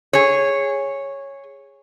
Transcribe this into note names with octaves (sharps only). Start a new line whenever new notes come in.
G#4 C#5